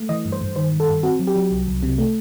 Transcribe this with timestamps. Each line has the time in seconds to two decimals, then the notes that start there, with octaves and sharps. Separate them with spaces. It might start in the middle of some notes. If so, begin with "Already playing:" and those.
Already playing: A3
0.09 E3 D#5
0.25 G2
0.32 C5
0.41 G2
0.56 D#3 C5
0.72 G2
0.80 A4
0.88 G2
1.03 C4 F#4
1.19 F#3
1.27 G4
1.36 F#3
1.51 C2
1.67 C2
1.83 C3
1.98 A3